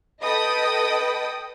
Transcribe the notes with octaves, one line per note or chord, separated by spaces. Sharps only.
A4 B4 D#5 G5 D#6